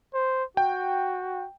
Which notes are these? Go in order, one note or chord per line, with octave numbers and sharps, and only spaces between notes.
C5
F#4 G5